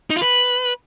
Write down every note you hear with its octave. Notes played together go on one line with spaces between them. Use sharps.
D#4
F4
B4